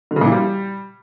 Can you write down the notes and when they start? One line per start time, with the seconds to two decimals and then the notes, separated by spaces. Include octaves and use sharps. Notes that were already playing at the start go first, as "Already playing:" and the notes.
0.11 D3
0.16 C#3
0.21 A#2
0.26 E3
0.32 G3